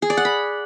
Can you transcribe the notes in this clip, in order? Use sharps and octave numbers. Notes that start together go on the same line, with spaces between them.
G#4
D5
F#5
B5